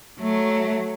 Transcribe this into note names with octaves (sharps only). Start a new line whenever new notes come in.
F#3 A3